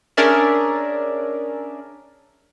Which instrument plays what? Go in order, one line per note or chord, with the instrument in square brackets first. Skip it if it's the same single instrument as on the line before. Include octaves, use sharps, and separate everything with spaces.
[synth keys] C#4 D4 G#4 A#4 D5 E5